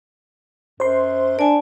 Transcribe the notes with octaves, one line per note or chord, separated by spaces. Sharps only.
F#2 C5 C6
D4 D5 G#5